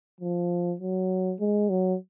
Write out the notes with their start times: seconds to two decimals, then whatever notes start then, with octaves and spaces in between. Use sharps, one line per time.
0.20 F3
0.80 F#3
1.40 G#3
1.69 F#3